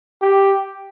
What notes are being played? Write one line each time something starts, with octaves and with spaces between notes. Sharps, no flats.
G4